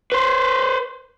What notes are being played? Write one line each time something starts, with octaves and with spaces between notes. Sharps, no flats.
B4 C5